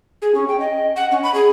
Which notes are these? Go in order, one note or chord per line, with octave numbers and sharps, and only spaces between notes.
G#4
C#4
G5
D#5
F#5
C#4
B5
G#4